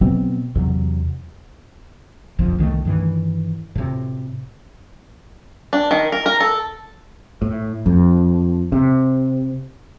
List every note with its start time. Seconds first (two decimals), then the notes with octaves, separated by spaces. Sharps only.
0.01 B2 F#3 B3 C4
0.55 E2 C3 F#3
2.39 D1 A#1 F2 F3
2.58 C2 D#3 F#3 A3
2.85 G2 D#3 E3
3.75 A2 C3
5.73 D4
5.91 D#3
6.12 A#4
6.26 A#4
6.40 A4
7.42 A2
7.86 F2
8.72 C3